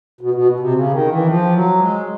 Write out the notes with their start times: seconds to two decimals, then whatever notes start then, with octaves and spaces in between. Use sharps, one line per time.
0.21 B2
0.34 B2
0.60 C3
0.74 C#3
0.91 D#3
1.08 E3
1.26 F3
1.53 F#3
1.79 G#3